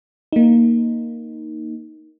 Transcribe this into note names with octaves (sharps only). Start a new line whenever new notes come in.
A#3 D#4